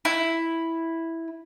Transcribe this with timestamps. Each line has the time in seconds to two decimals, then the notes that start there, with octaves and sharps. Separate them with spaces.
0.05 E4